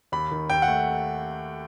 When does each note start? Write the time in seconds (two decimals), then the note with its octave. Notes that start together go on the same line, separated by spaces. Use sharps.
0.12 D#2 B5
0.31 D#3
0.50 D#2 G5
0.62 F#5
0.68 A3